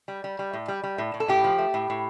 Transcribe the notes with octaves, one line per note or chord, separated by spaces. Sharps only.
G3
G3
G3
A2
G3
G3
A2
A2
A4
A2 G4
F3
A3
A2
A2